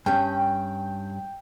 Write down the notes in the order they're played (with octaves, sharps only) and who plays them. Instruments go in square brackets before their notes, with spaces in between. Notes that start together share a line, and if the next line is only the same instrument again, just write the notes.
[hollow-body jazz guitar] G2 C#4 [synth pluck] G5